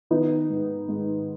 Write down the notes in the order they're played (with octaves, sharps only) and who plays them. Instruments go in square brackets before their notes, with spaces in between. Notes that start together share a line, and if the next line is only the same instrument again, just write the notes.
[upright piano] D#3 B3 D#4
G#2
G#2